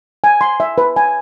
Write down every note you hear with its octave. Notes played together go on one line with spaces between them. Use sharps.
G#5
C6
E5
B4
G#5